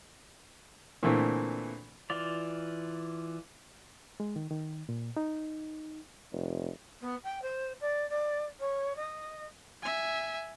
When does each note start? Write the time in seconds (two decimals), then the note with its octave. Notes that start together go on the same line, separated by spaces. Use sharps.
1.03 A#2 D3 E3 A3 C4
2.10 E3 F4 D5
4.20 G#3
4.36 D#3
4.51 D#3
4.89 A#2
5.17 D#4
6.32 F1
7.01 B3
7.23 G5
7.42 C5
7.80 D5
8.09 D5
8.60 C#5
8.96 D#5
9.82 E5 G#5